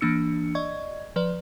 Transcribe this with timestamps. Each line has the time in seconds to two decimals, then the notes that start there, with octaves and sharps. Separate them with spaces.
0.01 E3 A#3 D4 E6 C#7
0.55 D5 D#5 C#6 G#6
1.16 F3 B4 D5